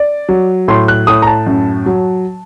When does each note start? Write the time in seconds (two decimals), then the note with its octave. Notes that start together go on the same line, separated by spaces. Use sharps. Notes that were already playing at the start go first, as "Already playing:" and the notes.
Already playing: D5
0.29 F#3
0.68 A2 C6
0.88 F#6
1.07 A2 D#6
1.22 A#5
1.27 A5
1.47 F#2
1.86 F#3